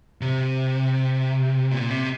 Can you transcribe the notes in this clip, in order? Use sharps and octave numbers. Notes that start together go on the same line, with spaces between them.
C3
A#2
C3